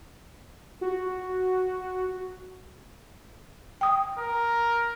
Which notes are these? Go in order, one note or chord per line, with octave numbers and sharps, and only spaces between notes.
F#4
G5 D#6
A#4